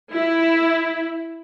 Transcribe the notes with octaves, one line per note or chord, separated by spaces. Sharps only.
E4